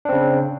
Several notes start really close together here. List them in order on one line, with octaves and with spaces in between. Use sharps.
D4 C4 C#3